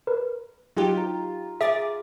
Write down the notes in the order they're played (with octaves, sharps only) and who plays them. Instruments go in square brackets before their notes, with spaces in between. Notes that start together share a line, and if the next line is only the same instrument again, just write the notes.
[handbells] A#4 B4
[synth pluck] F#3 D#4 G4 [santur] F4
[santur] A#5
[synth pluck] G#4 D6 A6 [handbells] E5